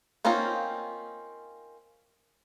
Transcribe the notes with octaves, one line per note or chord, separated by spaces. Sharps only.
A#3 C4 C#4 D#4 F4